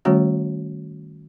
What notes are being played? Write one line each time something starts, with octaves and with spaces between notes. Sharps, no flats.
D#3 G3 A3 C#4 F#4 C#5